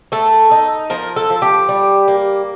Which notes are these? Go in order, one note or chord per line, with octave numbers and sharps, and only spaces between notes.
A3 A4
D#4
F3 A#4
A4
F3
G4
G3
A#3